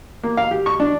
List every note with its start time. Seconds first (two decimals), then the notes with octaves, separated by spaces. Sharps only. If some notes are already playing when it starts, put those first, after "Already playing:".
0.24 A#3
0.37 F5
0.51 G4
0.66 C#6
0.80 D4